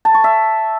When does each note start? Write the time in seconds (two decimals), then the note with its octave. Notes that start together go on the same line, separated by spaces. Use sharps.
0.05 A5
0.15 C#6
0.24 E5